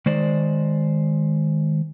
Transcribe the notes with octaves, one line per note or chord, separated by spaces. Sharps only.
D#3 G#3 C5 D5